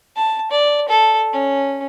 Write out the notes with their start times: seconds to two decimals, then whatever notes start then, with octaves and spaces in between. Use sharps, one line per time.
0.16 A5
0.51 D5
0.89 A4
1.33 C#4